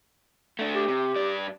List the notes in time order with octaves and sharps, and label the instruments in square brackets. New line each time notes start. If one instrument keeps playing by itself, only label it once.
[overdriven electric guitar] A3 D4
[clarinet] G4
[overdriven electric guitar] C3
G2 D5